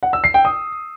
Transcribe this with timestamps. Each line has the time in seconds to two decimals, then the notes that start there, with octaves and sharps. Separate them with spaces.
0.03 F#5
0.13 E6
0.24 C7
0.34 G5
0.45 D#6